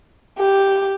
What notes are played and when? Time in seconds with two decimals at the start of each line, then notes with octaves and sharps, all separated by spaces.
0.39 G4